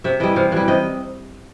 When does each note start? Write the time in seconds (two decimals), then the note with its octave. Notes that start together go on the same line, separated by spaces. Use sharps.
0.04 C3 E5
0.20 E3 G3 D#5
0.36 C3 F5
0.52 E3 G3
0.68 C3 D#5